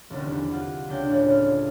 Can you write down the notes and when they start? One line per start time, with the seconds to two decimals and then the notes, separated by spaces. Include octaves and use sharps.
0.10 D#1 C2 D3 D#3
0.28 E2
0.51 F4 F#5
0.89 C#2 D4 G5
1.10 A1
1.31 F6